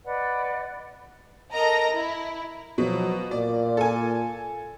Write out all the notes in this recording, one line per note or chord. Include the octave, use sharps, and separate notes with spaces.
B4 D5 D#5 F#5
A4 A#4 D#5 A#5
E4
B2 F3 F#3
A#2 D5
A4 G#5